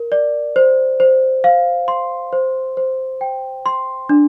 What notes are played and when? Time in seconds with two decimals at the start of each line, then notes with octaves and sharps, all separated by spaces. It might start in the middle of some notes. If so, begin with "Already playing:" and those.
Already playing: A#4
0.12 D5
0.56 C5
1.00 C5
1.44 F5
1.88 C6
2.33 C5
2.77 C5
3.21 G5
3.66 C6
4.09 D4